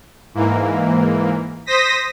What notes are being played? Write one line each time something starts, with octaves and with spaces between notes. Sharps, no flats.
G#2 E3 A#3
C5 D#6 A#6 B6